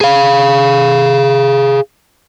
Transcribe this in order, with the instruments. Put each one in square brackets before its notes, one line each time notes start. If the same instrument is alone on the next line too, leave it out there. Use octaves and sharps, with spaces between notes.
[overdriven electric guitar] G#4 F5